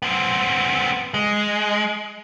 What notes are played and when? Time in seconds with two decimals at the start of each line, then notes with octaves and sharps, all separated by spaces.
0.02 B3 C4
1.14 G#3